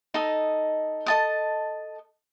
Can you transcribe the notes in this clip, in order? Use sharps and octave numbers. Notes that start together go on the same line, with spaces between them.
D#4 A4 D#5
A4 D#5 A5 D#6